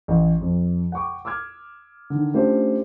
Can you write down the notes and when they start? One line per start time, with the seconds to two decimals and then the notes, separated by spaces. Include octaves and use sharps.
0.08 A1
0.41 F2
0.92 F#5 G5 C#6 D6
1.25 D6 E6 F6 G#6
2.10 D3 D#3
2.34 A3 C#4 D4 F4 G4 C5